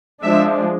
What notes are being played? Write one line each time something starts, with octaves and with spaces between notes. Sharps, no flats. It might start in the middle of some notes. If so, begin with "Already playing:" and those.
F3 G#3 D4 E5